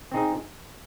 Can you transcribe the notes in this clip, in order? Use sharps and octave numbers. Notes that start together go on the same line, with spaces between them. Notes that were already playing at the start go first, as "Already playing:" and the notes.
C4 D#4 G#4